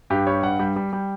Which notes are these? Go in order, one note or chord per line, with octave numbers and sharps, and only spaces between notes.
G2 G4
G3 C#5
G2 F#5
G3 G5
G3
G3